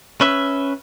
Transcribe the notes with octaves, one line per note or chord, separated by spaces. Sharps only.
C#4 B4 E5